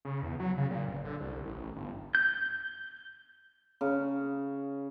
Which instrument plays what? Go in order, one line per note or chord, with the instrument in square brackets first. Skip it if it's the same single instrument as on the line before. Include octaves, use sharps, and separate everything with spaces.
[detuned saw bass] C#3
E2
F#3
C#3
A#2
G1
D3
C2
A1
A1
G1
[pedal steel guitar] G6
[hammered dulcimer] C#3